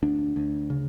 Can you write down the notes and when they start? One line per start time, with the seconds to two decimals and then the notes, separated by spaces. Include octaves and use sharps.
0.03 D2 D4
0.36 D2
0.70 C#3